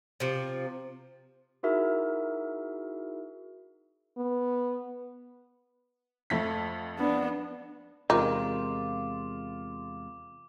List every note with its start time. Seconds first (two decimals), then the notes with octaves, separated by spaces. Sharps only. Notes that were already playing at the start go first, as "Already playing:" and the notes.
0.20 C3 F3
1.63 D#4 E4 F#4 G#4 A#4 E5
4.18 B3
6.30 F2 A3 B6
6.99 B3 D4
8.10 E2 C3 G#3 D#4 F4 A#4 F5 D6